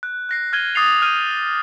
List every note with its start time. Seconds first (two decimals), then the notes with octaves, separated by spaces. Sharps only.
0.03 F#6
0.29 F#6 A#6 C7
0.53 F6 G#6 D#7 G7
0.75 D6 D#6 A6 C7 F7
1.02 F6 G6 D#7
1.31 G7